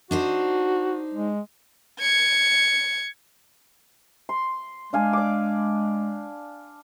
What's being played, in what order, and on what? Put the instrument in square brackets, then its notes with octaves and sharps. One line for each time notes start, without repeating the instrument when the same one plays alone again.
[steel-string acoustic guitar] D4 D#4 C5 [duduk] F#4
[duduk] G#3
[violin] G#6 C#7
[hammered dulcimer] C6
[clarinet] G#3 [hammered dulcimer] D4 F5 G#5
[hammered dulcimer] D5 D6